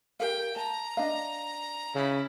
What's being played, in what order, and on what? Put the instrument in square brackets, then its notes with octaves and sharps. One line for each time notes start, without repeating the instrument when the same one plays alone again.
[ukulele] G4 A#4 F5 [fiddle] G5
[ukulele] A5 [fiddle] A#5
[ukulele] D4 D#5 F5
[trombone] C#3 [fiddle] E4